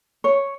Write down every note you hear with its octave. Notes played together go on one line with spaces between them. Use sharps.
C#5